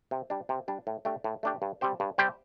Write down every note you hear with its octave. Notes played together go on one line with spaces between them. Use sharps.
C3
G3 D4
C3
G3 D4
A2
A3 D4 G4
A2
A3 D4 G4
G2
G3 C4 G4 C5
G2
G3 C4 G4 C5